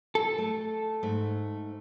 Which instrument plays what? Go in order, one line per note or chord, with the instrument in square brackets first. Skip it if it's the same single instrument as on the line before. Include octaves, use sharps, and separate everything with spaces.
[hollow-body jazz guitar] A4
[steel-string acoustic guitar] A3
G#2 A3